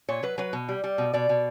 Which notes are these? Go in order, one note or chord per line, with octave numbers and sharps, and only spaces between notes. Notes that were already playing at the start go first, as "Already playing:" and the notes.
A#2 C#5
F#3 B4
F#3 B4
B2
G3
G3
B2
B2 D5
B2